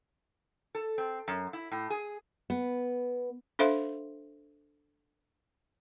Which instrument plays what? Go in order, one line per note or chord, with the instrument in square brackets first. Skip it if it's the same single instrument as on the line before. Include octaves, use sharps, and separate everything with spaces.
[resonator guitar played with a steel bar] A4
C4
F#2
E4
A2
G#4
[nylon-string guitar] B3
[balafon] D4 A4 C5 E5 F5 C6